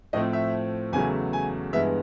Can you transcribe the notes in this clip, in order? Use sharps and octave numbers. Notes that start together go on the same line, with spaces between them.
A2 F3 A3 C4 D#5
E5
E2 C#3 F#3 A3 G#5
G#5
G2 E3 G#3 B3 E5